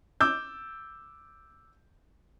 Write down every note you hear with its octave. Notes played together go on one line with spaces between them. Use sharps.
D6 E6 G6